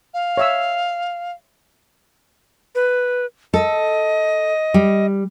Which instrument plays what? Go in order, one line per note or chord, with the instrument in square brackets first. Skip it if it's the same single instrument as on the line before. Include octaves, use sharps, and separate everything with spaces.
[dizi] F5
[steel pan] C#5 E5 E6
[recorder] B4
[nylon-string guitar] A4 [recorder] D#5
[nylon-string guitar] G3